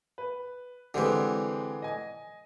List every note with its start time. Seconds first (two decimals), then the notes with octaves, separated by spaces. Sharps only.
0.18 B4
0.94 D3 E3 G#3 C4 G4
1.82 D#5 G#5